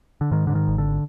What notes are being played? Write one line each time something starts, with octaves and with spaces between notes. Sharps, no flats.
D3
G#2 D#3
G#2 D3
D#3
G#1
D3